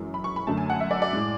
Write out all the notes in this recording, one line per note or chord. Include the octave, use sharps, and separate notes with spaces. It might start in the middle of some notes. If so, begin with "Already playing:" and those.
Already playing: F#2 E3 G#3
B5
C#6
B5
F#2 D3 F#3 A3 A5
G#5
F#5
E5
D5
D5
A2 G#3